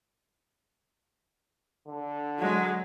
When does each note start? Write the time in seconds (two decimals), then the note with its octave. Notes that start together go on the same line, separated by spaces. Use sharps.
1.88 D3
2.39 F#3 G#3